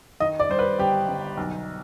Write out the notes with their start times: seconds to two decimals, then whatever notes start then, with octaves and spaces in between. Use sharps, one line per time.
0.20 D#3 D#5
0.40 D5
0.49 G2 C5
0.59 B4
0.79 G1 G4
1.08 G1
1.37 B1